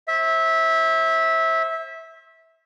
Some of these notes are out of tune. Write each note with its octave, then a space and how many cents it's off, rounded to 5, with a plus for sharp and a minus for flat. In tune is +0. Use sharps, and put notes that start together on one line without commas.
C5 +40 E5 -15